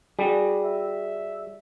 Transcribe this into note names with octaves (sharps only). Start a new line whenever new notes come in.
G3 F#4 G#4
E5